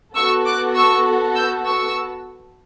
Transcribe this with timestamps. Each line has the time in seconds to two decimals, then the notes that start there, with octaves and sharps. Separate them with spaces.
0.16 B3 F#4 A4 C#6 E6
0.46 D6 F#6
0.76 C#6 E6
1.35 E6 G6
1.65 C#6 E6